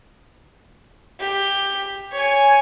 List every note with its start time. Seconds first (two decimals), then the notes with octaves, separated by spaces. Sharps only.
1.20 G4
2.12 C#5 G#5